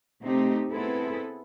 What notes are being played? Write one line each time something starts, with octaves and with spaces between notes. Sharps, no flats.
C3 A3 C4 D#4 G4
B3 C4 E4 G#4 A4 B4